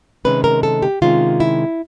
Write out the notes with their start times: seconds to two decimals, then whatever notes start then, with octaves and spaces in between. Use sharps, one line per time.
0.25 C3 D#3 G#3 C#4 B4
0.44 A#4
0.63 A4
0.82 G4
1.02 C3 D#3 G#3 C#4 F4
1.40 E4